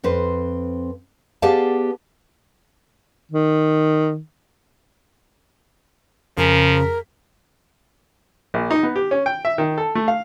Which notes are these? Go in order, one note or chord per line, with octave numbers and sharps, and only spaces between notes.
F2 C4 B4 C5
B3 G4 G#4 D5 F5 A5
D#3
F2 C#3 F3 G#4 A#4 B6
A#1
D#4
B3
G4
C#4
G5
E5
D#3
A4
A3
F5